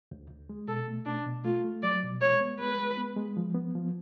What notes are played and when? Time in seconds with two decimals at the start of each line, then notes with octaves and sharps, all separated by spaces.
0.11 D2
0.30 D2
0.49 G#3
0.68 B2 A4
0.88 A3
1.06 B2 D4
1.26 B2
1.44 A3 F4
1.64 A3
1.83 F#3 D5
2.03 B2
2.21 G#3 C#5
2.41 B3
2.59 G#3 B4
2.79 G#3
2.98 B3
3.16 G#3
3.37 F3
3.55 B3
3.75 F3